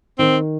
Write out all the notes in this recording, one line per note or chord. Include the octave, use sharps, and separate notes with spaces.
D#3 C4